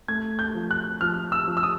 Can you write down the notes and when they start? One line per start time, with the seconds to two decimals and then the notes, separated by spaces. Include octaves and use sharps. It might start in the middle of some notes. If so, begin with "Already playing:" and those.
0.08 A3 G#6
0.39 G6
0.55 F3
0.71 F#6
1.01 F3 F6
1.32 E6
1.48 F3
1.57 E6
1.63 D#6